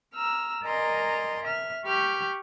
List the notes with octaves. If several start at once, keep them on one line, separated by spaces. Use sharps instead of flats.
A#5 E6 F6
A#4 D5 D#5 G#5 A#5 C6
E5 F6
G4 B5 C#6 D6 F6 G6